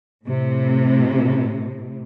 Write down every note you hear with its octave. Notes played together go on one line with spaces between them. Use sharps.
A2 C3